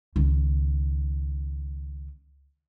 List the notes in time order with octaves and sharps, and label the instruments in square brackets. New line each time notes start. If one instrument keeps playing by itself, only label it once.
[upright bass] C#2 D#3